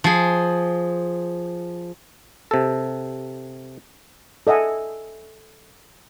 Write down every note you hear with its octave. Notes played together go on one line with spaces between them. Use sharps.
F3 G#4
C3 A4
A4 D#5 E5 F#5 G#5